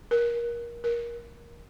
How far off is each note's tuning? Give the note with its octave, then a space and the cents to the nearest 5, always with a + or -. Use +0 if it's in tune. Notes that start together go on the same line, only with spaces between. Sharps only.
A#4 +20
A#4 +15